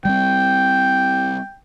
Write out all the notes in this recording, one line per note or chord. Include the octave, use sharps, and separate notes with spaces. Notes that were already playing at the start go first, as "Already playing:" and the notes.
G3 G#3 C4 G5